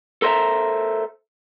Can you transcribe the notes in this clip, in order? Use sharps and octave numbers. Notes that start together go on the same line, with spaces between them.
A4 A#4 C5 D5 E5 A#5